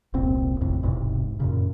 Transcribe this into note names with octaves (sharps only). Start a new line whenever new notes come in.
E1 C2 A#2 C4
G#1 F2 A2 C3
E1 B1 G#2 C3
F#2 A#2 C#3